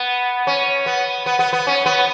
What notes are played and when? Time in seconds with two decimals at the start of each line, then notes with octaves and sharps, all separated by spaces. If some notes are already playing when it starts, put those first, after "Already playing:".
Already playing: B3
0.47 C#4
0.86 B3
1.26 B3
1.39 B3
1.53 B3
1.67 C#4
1.86 B3